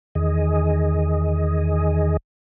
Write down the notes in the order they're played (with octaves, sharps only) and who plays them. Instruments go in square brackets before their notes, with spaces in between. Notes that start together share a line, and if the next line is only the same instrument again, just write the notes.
[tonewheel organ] E2 D#3 G#4 D#5